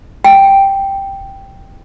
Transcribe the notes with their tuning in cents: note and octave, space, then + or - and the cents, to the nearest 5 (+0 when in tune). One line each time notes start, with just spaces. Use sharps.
G5 +0